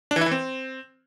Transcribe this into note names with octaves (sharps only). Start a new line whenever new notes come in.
D4
E3
E4
E3
C4